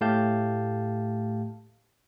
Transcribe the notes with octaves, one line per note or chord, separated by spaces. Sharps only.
A2 A3 G4 F5 A5 G6